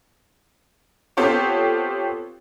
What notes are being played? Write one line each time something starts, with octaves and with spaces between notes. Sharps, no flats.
B3 C4 F4 G4 A4 C#5